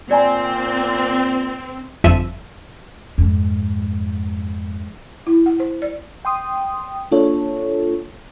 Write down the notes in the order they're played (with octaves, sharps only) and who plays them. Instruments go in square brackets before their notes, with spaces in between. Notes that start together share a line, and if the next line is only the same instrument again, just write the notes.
[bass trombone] A#2 [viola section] C4 [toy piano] D5 G#5 A#5
[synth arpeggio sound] G1 F2 F3 E5 D#7
[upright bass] F2 G#2
[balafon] E4
F#5
C5
D5
[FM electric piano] G5 C6 D#6
A#3 D4 F4 A4 C#5